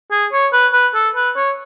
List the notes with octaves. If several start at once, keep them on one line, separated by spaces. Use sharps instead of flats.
G#4
C#5
B4
B4
A4
B4
C#5